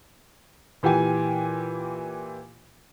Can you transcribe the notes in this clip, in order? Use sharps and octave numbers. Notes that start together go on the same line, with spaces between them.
A#2 E3 G4 G5 G#5